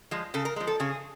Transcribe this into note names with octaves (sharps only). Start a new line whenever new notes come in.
F3 G#3
C#3 A4
A#4
F3 G#3
A4
C#3 G#4